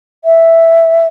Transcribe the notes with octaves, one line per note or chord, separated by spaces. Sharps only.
E5